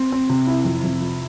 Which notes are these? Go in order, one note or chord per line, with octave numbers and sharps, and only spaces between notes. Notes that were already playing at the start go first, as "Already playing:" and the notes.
Already playing: C4
C4
C3
E4
F2
F2
F3